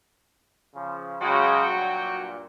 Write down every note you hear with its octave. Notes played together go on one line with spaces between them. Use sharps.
C#3 F3
C#3 F#3 G#3 F#4 G5
G2 A#2